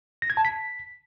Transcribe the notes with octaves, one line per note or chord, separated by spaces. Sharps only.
A#6
G#6
A5
B6